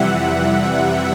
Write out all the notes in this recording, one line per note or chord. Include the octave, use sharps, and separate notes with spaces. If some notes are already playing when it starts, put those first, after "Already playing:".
Already playing: F2 C3 E3 G3 E5 F#5